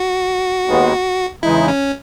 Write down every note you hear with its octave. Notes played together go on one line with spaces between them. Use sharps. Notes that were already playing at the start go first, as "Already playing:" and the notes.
Already playing: F#4
D#2 D#3 G#3 B3
E2 C#3 E3 G#3 D#4 E4
C#4